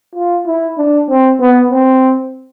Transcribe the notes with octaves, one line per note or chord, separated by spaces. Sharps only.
F4
E4
D4
C4
B3
C4